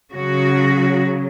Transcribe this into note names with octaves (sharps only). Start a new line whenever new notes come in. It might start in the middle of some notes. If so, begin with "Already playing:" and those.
C#3 F#3 F#4